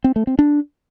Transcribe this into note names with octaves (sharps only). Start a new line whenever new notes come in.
C4
A3
C4
D4